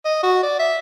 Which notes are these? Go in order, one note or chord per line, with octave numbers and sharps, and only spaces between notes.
D#5
F#4
D5
E5